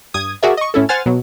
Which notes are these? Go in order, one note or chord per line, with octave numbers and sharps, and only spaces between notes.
G2 D#6 G#6
F#4 G#4 A#4 D5 E5
D#5 C#6
A2 C#4 E4 A4
C5 F#5 G#5 F6 A6
B2 F#3